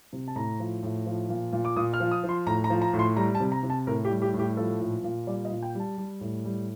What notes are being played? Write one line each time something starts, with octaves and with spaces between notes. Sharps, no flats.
C3
A5
A2 A#5
F3
A2
F3
A#2
A#2
D6
A#2 D#6
F6
F3
D#6
F3
C6
A2 A#5
A#5
F3
A#5
A2
C6
G3 A#5
A5
C3
A#5
C3
A5
A2 A#4
G4
G3
G4
A2
G4
F3 A4
A#2
A#2
G3 D5
D#5
A#2
G5
G3 A5
G3
A2
G3